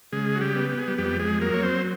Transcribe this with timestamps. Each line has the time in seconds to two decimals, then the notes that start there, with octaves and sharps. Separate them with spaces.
0.12 C#3 G#3 G#4
0.36 F#4
0.41 G3 G4
0.55 B3
0.70 G4
0.79 G#4
0.88 G3 G4
0.98 F2 G3 G4
1.19 G#3 G#4
1.41 F#3 A#3 A#4
1.54 C#5
1.63 C4 C5